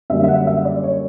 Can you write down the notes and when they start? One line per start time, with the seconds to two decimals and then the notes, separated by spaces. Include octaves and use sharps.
0.10 F#2 D3 G3 A#3 E5
0.24 E5
0.28 F#5
0.47 E5
0.65 D5
0.84 C#5